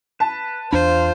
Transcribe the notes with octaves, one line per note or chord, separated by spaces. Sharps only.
B4 A5
E2 D4 F4 C5